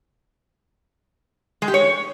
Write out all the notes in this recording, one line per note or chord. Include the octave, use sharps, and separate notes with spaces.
G#3
G4
C#5